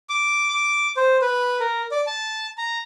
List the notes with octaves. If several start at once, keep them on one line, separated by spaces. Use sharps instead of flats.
D6
D6
C5
B4
A#4
D5
A5
A#5